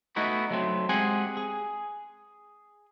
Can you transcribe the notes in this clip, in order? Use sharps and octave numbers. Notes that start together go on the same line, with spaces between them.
A3 B3 D#4 E4 F#4 B4
F#3 A3 C4
G#3 C4 G4 G#4 F#5 G#5
G#4